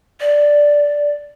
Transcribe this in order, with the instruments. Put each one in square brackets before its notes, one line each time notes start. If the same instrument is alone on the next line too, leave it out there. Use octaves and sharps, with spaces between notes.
[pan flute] D5